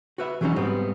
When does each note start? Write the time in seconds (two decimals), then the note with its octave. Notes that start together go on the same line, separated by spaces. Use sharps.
0.18 F#4 B4 E5
0.41 E3 F#3 G#3 C#4 D#4 F#4
0.56 G#2 G3 B3 C4